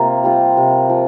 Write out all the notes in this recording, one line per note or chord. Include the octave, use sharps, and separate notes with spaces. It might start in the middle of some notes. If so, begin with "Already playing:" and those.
Already playing: C3 A#3 F4
G3 C4 F4
C3
F3